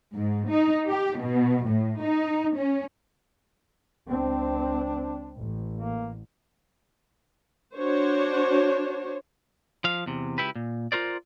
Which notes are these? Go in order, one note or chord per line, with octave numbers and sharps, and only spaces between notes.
G#2
D#4
G4
B2
A2
D#4
C#4
C#2 C4 D4
A1
A#3
D4 F#4 C5 C#5
F3 F5
E2 C3
C#2 E4 G4 B4
A#2
F4 F#4 A#4 C5 D5